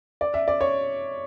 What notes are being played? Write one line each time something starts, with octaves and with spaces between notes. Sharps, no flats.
D5
E5
D5
C#5